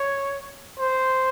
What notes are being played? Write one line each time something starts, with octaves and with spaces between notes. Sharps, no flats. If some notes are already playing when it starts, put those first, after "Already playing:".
Already playing: C#5
C5